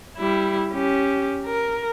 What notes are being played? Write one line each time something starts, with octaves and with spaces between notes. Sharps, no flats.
G3 E4
C#4 G4
A#4